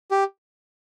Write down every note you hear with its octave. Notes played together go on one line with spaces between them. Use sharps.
G4